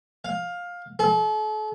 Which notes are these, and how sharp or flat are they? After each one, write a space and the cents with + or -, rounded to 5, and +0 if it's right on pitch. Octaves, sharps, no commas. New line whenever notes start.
F5 +15
A4 -40